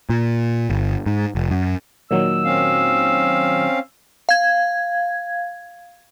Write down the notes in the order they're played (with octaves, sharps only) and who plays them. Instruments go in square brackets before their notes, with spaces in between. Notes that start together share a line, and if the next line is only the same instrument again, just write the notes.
[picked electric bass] A#2
G1
G#2
F1
F#2
[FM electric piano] A#2 D#3 F#3 [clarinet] E6
[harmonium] C4 C#4 F5
[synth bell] F5 G#6